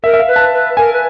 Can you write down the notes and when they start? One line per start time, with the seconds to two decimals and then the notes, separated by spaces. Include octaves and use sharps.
0.03 A#4 E5
0.13 E5
0.20 F5
0.27 B4
0.36 A5
0.52 B4
0.77 A#4 G#5
0.93 B4